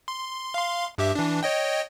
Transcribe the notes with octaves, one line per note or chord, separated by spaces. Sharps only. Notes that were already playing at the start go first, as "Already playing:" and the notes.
C6
F5 C6
G2 G4 E5
E3 D4
C#5 D#5 G5